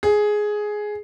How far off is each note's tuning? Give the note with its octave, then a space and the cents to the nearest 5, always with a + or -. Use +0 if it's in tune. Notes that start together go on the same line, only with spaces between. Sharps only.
G#4 +10